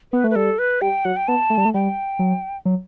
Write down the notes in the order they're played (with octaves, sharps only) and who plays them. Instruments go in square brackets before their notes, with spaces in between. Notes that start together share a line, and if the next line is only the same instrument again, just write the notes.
[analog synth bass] B3 [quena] B4
[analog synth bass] A3
[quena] B4
[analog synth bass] G3 [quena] A4
[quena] B4
[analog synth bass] G3 [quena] G5
[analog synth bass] F#3 [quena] F#5
[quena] G5
[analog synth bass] B3 [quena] A5
[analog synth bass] A3
G3
A3
[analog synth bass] G3 [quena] G5
[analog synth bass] F#3
F#3